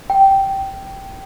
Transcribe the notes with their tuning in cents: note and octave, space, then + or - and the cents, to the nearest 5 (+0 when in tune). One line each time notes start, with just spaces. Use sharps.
G5 -10